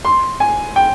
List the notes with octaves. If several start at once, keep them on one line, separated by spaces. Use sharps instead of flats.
C6
G#5
G5